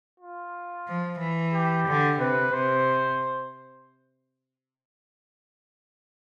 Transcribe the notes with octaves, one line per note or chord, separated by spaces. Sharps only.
F4
F3
E3
G4
D3
C3 B4
C3 C5